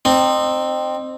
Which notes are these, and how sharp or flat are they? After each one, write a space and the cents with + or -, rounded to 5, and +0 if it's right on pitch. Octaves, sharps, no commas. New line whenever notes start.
C4 +0 D#4 -30